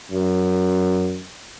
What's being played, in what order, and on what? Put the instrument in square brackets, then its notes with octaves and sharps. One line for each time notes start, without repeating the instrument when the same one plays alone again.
[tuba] F#2